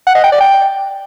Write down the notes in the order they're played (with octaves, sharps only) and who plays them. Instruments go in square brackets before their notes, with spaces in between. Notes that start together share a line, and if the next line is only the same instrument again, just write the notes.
[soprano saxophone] F#5
D#5
G5
D5
G5